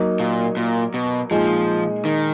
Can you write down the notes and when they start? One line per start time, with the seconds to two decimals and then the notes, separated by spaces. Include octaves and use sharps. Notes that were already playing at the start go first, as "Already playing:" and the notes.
Already playing: F#3 A#3 D#4
0.20 A#2
0.57 A#2
0.94 B2
1.31 A#2 F3 G#3 D#4 G#4
2.05 D#3